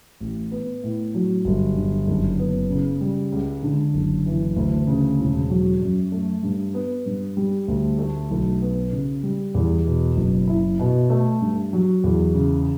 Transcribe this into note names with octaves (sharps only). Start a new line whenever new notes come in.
A1
B3
A2
F#3
G1
D3
F#1
B3
C#3
G3
C#2
D3
F#1
E3
D2
C#3
E1
F#3
F#2
A3
G2
B3
G2
G3
D2
A3
B1
B3
C#3
G3
E2
B2
F#1
E4
B2
A3
G2
F#3
E2
C#3